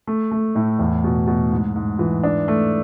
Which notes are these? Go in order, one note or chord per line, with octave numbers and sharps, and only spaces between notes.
A3
A3
A2
E2
B2
B2
G#2
G#2
E3
D4
A3